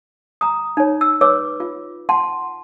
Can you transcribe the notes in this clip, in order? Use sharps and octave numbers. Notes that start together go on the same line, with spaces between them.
A#5 D#6
D#4 C#5
E6
B4 C#5 D6 E6
F4
F#5 G5 A5 C6